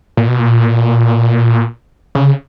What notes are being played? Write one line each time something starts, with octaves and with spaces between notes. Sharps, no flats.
A#2
B2
A#2
C#3